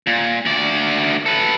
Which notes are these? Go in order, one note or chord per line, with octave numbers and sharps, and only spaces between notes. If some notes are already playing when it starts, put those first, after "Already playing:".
A#2
D2 D5
A4 B4